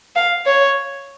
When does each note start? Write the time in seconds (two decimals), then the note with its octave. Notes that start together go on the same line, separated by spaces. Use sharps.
0.16 F5
0.46 C#5